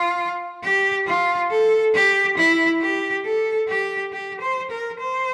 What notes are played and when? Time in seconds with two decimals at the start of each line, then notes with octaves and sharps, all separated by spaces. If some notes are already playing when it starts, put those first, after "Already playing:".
Already playing: F4
0.63 G4
1.07 F4
1.51 A4
1.95 G4
2.37 E4
2.82 G4
3.25 A4
3.68 G4
4.12 G4
4.41 C5
4.71 A#4
5.00 C5